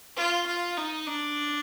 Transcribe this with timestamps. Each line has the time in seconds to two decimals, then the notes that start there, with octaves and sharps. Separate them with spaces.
0.16 F4
0.47 F4
0.77 D#4
1.07 D4